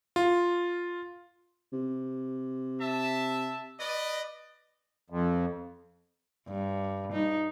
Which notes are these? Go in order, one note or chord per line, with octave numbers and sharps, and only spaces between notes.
F4
C3
E5 A5
B4 D5 D#5
F2
G2
D#4